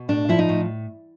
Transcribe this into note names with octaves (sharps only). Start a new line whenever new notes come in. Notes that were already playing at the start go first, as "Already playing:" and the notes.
Already playing: B2
A2 D4
F3 E4
D#4
A2